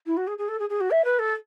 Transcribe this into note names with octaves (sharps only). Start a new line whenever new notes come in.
E4
F#4
G#4
G#4
A4
G#4
G#4
F#4
E5
B4
A4